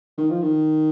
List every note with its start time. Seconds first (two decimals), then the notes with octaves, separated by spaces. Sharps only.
0.18 D#3
0.30 F3
0.42 D#3